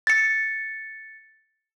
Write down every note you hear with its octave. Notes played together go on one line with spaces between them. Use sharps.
A6 C#7